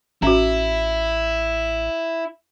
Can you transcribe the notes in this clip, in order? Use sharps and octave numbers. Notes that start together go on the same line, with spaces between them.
A1 C#4 E4 F#4